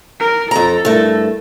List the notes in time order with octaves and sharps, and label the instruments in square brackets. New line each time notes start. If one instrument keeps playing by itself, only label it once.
[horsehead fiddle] A#4
[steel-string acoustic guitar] F2 A#5 [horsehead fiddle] A4
[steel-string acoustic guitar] G2 A3 [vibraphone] E4 A#4